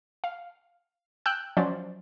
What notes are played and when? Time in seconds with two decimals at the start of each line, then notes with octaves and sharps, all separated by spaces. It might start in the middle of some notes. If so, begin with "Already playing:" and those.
0.24 F5
1.26 G5 E6 F#6 G6
1.57 F3 F#3 C#4 C5 D5